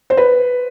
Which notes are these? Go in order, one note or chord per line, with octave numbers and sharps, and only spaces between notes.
C5
B4